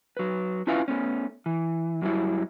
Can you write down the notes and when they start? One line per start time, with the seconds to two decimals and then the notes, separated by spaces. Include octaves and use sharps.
0.17 F#3 B4
0.67 C#4 E4 F4 B4 E5 F5
0.88 A3 B3 C#4
1.46 E3
2.02 F#2 F#3 G3 E4